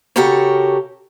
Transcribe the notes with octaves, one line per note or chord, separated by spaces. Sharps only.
C#3 F#4 G4 A4 A#4 C#5